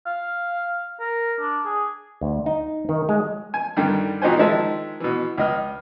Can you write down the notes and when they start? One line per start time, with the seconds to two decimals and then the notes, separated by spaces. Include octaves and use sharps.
0.06 F5
1.00 A#4
1.40 D4
1.65 G#4
2.21 D2
2.46 D#4
2.89 D#3
3.09 G#3
3.54 G#5
3.77 G2 D3 D#3 G3
4.22 A#2 D#4 F#4 G4 C5 G#5
4.38 D#3 F3 G#3 E5 A5
5.00 B2 E3
5.38 C#2 D#5 F6